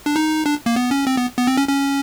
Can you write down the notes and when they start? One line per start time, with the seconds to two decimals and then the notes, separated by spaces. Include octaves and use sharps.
0.06 D4
0.16 D#4
0.46 D4
0.66 A#3
0.76 B3
0.91 C#4
1.07 C4
1.17 B3
1.38 B3
1.47 C4
1.57 C#4
1.68 C#4